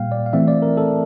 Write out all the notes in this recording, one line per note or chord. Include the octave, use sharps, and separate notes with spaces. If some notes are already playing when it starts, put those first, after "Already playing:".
Already playing: A#2 G3 A#3 F5 G5
D5
F5
E3 A3 C4 E5
D5
A#4
A4